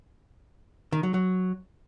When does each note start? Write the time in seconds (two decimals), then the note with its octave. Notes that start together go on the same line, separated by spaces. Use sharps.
0.92 D#3
1.03 F#3
1.14 F#3